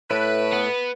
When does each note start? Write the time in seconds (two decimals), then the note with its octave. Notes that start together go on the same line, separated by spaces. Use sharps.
0.11 A2 A3 E4 B4
0.53 B3